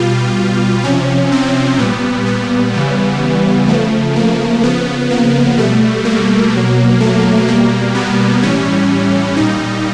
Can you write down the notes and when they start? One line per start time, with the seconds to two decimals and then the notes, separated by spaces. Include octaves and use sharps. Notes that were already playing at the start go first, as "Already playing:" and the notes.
Already playing: B2 G3 F4
0.84 C3 F3 C#4
1.32 C4
1.78 A#2 G3 B3
2.26 B3
2.74 C#3 E3 G3
3.68 C#3 F3 A3
4.16 A#3
4.63 C#3 F3 B3
5.10 A#3
5.57 B2 G3 A3
6.05 A#3
6.53 B2 F#3
7.00 A3
7.47 B2 G3 A#3
7.95 B3
8.43 A2 E3 G3 C#4
9.37 A#2 G3 D#4